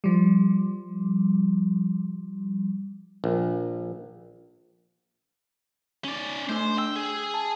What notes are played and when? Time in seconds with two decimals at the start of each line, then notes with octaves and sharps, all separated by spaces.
0.04 F3 G3
3.24 A#1
6.04 C#4 D5
6.49 A3 D4 C5
6.78 G5 E6
6.96 G#4
7.34 A5